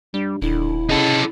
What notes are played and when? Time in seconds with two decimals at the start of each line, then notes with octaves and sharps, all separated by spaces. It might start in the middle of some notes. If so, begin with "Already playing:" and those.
0.14 G2 G3
0.42 D#1 D3 E4
0.90 C#3 D#4 A4